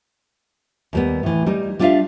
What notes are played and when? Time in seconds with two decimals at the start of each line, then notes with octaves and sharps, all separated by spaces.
0.93 D#2 G3 B3
1.23 A2 E3
1.46 G3 D#4
1.79 G3 D4 F4 A4 E5 F5